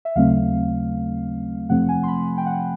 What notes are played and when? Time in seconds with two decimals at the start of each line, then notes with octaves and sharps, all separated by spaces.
0.05 E5
0.16 D#2 C#3 F#3 A3 C4 F5
1.69 F2 C3 F3 A3 C4 F#5
1.89 G#5
2.03 C6
2.08 B5
2.38 G5
2.46 F#5